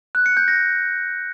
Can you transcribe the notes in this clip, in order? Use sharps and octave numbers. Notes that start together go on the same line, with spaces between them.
F#6
C#7
G6
A#6